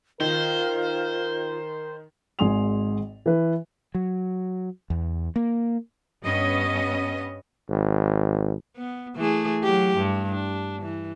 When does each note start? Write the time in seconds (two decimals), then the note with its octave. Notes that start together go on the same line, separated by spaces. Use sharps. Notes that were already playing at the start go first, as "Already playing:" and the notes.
0.20 D#3 F4 A#4 C5
2.39 G#1 G#2 G#5 C6 D#6 F7
3.26 E3 B4
3.95 F#3
4.90 E2
5.36 A#3
6.25 G2 B3 C#4 D#5
7.70 G#1
8.77 B3
9.16 E3 A3 G#4
9.63 F#3 G4
9.97 G2
10.30 D4
10.82 E3